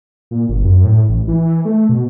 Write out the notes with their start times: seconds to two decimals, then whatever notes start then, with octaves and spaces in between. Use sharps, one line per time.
0.31 A#2
0.49 G1
0.64 F#2
0.85 A2
1.09 A1
1.28 E3
1.65 A3
1.89 B2